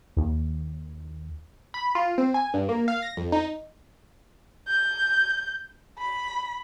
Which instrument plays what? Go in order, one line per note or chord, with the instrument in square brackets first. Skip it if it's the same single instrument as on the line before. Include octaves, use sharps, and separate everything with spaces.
[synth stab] D#2
B5
F4
C4
G#5
G2
A#3
F5
A#6
F2
D#4
[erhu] G6
B5